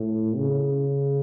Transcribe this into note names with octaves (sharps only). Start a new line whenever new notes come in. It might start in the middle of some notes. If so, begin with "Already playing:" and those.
Already playing: A2
C#3